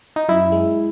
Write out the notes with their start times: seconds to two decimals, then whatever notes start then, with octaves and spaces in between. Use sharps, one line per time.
0.16 D#4
0.29 F#2 E4
0.52 G#3